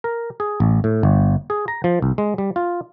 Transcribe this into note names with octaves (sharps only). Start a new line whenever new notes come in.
A#4
G#4
A1
A2
G1
G#4
A#5
F3
C2
G#3
G3
F4